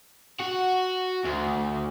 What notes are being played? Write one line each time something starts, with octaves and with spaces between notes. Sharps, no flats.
F#4
D2